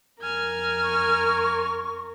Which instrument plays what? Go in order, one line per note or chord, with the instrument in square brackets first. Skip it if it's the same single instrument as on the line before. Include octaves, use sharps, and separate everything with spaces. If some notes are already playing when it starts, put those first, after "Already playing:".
[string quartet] F2 A#4 [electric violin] G#5 F6
[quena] C#6